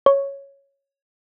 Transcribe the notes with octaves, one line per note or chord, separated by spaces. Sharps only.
C#5